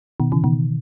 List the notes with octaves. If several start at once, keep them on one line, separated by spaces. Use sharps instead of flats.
B2 D#3
C#3 E3
B2 D#3